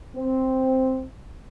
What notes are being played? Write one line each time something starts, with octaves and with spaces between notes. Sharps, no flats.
C4